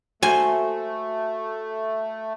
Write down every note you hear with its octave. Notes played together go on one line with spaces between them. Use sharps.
A3 F#4 C5 G#5